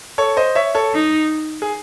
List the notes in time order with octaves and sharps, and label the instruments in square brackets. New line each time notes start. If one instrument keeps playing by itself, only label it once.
[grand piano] A4 C#5
C5 D#5
C#5 E5
A4 C#5
[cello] D#4
[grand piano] G#4